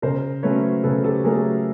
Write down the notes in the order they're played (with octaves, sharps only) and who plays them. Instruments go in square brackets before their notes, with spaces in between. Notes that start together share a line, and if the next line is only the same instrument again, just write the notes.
[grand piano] C#3 A#4 C5
F#3 A3 C#4 B4 C#5
C#3 A4 B4
G4 A4
F#3 A3 C#4 G#4 A#4